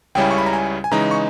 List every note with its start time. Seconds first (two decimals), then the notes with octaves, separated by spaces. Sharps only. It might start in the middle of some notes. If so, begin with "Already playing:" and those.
0.15 C#2 C#3 G3 C#4 E4 G5
0.31 C#6
0.38 B5
0.46 A#5
0.53 G#5
0.84 G#5
0.91 C#3 E3 G#3 D#4 A#5
1.11 C#6